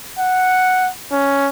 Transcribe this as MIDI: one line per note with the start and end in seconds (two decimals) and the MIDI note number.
0.19 0.89 78
1.12 1.49 61